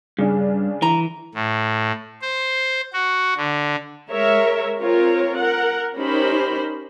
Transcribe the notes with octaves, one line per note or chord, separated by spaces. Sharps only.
G2 C#3 D4 G#4
E3 A#5
A2
C5
F#4
D3
G#3 A#4 C#5 E5
C4 F4 A#4 C#5
A#4 F#5
C#4 D#4 G4 A#4 C5 B5